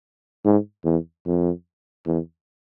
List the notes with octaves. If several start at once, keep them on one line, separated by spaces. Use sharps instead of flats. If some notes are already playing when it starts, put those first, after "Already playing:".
G#2
E2
F2
E2